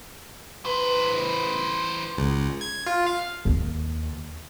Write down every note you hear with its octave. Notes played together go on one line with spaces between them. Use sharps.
E3 B4 C5
C#2
G#6
F4
F5
D#2